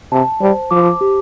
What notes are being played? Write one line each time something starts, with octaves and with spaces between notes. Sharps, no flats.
C3 A5
G3 C5
F3 D6
G4